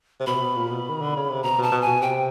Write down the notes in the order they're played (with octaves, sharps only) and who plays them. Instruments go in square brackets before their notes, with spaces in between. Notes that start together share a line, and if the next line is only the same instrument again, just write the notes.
[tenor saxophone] C3
[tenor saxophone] B2 [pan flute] B5
[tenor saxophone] C3
B2
A#2
B2
D#3
D3
C#3
C3
[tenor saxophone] B2 [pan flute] A#5
[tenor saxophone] B2
[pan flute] A5
[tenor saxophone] B2
[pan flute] G#5
[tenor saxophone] B2
[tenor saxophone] C3 [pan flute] G5